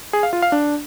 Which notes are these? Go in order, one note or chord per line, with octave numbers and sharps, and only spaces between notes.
G#4
F5
F4
F5
D4